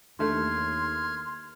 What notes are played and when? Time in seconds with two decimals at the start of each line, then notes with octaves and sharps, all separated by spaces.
0.19 D#2 D3 A3 C6 F6 G#6